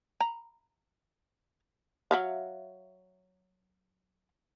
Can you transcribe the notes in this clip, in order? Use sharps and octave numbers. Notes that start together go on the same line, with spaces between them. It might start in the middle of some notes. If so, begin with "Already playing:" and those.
A#5 B5
F#3 E5 F5